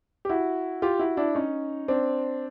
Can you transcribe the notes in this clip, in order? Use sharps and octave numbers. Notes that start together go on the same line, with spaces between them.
G4
E4 F#4
F4 G4
E4 F#4
D4 E4
C#4 D#4
C4 D4